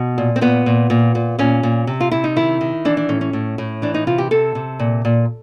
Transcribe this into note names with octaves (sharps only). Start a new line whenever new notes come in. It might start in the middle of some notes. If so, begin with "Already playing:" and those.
Already playing: B2
A#2
C4
A#2 B3
A#2
A#2
A#2
A#2 C#4
A#2
C3
F4
C3 E4
D#4
D#3 E4
D#3
E3 D4
D4
A2 C#4
C#4
A2
A2
E3 D4
D#4
C3 F4
G4
C3 A4
C3
A#2
A#2